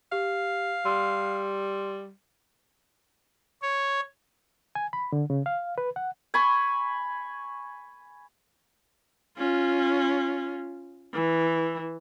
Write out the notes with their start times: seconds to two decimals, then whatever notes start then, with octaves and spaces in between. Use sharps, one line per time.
0.12 G4 F5
0.85 G3 C6 E6
3.62 C#5
4.75 G#5
4.93 B5
5.12 D3
5.30 C#3
5.46 F5
5.78 B4
5.96 F#5
6.34 G#5 B5 C#6
9.37 C#4 F4
11.13 E3